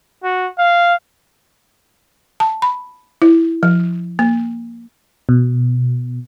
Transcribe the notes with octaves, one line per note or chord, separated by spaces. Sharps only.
F#4
F5
A5
B5
E4
F3
A#3
B2